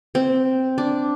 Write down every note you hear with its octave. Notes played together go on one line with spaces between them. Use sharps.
C4
D4